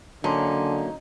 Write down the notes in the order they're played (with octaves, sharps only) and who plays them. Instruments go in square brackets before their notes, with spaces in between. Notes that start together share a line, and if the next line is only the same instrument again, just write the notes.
[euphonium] D3 [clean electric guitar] F#3 A#3 C#4 [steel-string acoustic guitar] D#4 [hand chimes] A5 C6 D6